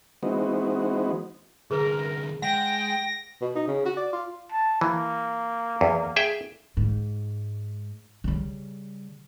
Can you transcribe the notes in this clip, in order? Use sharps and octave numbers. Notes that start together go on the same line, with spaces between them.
E3 G#3 B3 C4 D#4 F#4
C2 D3 G#4 A#4 B4
G#3 F#5 G5 A#6
B2
D#4
C#3
F#4
D5
F4
A5
E3 A#3
E2
G#4 E5 G5
G#2
C#3 G3